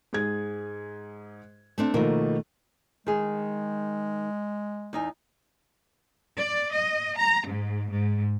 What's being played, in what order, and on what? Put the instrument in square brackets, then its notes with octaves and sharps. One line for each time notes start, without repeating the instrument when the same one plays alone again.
[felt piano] G#2 G#4 G#6
[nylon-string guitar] A3 C4 D4
[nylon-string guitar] B2 A#3 A#4 [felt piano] D#3 F3 A3
[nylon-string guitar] D#3 G#4 [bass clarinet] G#3
[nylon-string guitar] E2 D#4 G#5
[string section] D5
D#5
A#5
G#2
G#2